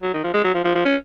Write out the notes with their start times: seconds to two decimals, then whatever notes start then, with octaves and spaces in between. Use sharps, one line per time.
0.02 F#3
0.14 D#3
0.24 F3
0.34 G#3
0.44 F#3
0.54 F3
0.65 F3
0.75 F3
0.85 C#4